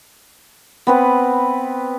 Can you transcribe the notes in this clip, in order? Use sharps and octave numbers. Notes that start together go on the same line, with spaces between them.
B3 C4 B4